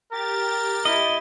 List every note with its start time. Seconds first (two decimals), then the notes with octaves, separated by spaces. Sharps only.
0.12 G4 A#4 A6
0.85 E4 D#5